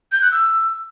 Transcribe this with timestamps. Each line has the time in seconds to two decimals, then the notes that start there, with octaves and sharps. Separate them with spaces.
0.12 G6
0.22 F#6
0.32 E6